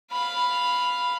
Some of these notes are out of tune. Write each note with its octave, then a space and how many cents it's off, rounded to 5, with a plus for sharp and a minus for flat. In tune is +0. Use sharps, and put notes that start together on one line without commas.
F5 +0 B5 +0